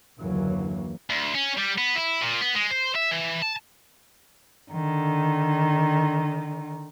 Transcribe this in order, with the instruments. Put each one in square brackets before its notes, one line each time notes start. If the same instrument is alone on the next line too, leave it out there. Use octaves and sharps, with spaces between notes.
[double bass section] F#1 D#2 D3 E3 F#3 A#3
[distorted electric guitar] D2
C#4
G3
B3
E4
A#2
B3
G#3
C5
E5
E3
A5
[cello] D3 D#3